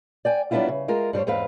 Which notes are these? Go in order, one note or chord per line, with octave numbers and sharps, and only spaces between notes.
D5 G5 G#5
F#3 G3 B3 D4 E4 F4
C#3
G#3 F4 A#4
G2 G3 C5 C#5
E2 G#2 C4 B4 F5